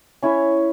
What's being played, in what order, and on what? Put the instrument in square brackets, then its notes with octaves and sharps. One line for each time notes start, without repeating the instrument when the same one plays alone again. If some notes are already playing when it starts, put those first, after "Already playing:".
[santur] C#4 E4 C#5 E5